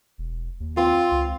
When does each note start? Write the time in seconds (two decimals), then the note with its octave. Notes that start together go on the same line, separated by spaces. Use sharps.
0.18 E1
0.60 D#2
0.77 C4 F4
1.11 C#2